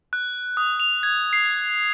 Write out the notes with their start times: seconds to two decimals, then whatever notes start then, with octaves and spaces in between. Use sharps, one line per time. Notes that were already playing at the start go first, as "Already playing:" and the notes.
0.13 F#6
0.57 D#6
0.80 F7
1.03 G#6
1.33 C7